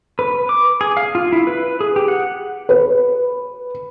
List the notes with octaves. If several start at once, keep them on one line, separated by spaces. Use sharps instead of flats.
B4
D6
G#4
F5
F4
E4
B4
G#4
G4
F#5
B4